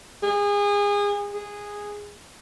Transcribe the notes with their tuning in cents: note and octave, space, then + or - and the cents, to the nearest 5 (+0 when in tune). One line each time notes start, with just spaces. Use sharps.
G#4 -30
G#4 -10